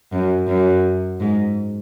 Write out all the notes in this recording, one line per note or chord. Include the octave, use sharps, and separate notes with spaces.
F#2
F#2
G#2